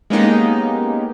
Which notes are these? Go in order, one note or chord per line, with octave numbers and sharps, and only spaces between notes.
G#3 A#3 B3 C#4 D#4 G4